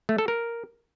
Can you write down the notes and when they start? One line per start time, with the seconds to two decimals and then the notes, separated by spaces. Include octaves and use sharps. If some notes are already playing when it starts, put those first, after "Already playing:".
0.09 A3
0.18 A4
0.28 A#4